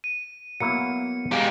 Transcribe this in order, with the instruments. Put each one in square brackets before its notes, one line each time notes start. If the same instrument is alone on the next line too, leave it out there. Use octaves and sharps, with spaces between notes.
[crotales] D#7
[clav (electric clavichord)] F#3 A#3 E4 [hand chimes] B3 F#5 [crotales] C#7
[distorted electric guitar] G#3 G4 [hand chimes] F5 A#5